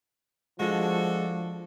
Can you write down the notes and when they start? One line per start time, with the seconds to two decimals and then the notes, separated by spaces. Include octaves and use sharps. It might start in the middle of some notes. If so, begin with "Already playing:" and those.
0.60 F3 G#3 D4 F#4 A4